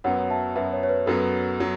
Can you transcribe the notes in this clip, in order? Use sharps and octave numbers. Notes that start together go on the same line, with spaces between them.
F#2 F#3 B3 C#5 F#5
E5 A5
F#2 F#3 B3 B4 E5
C#5
C#5
B4
F#2 F#3 B3 A4
F#3